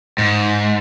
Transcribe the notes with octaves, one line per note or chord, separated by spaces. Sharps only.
G#2